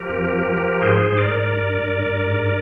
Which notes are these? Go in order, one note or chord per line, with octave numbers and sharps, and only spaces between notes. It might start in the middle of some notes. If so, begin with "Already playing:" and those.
Already playing: F3 G4 A#4
F2
F3
F3
G#2 G#4 C5
G#2
A#4 D5
G#2
G2
G2
G2
G#2